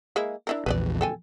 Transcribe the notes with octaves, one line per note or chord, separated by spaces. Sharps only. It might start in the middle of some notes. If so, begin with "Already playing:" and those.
G#3 A#3 E4
D4 E4 A#4
A#1 E2 B4 C5 D5
A4 G5 G#5